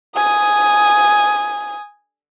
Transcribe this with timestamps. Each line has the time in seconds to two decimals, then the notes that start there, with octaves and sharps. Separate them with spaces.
0.16 G#5 D#6